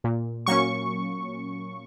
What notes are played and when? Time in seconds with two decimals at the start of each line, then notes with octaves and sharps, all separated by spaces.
0.04 A#2
0.46 F#3 A#3 C#4 C#6